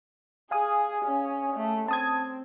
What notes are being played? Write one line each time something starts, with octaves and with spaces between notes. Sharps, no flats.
G#4 F5 G#5 D#6
C#4
A3
C4 A5 D#6 G#6